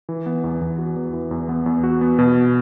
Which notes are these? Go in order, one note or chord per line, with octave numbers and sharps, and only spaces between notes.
E3
B3
E2
E2
F#4
E2
E3
E2
B3
E2
F#4
B3
B2